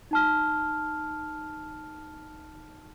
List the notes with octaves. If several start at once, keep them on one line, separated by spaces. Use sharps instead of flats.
D#4 A5 F6